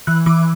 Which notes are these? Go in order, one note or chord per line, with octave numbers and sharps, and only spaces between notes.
E3 F#6
E3 D6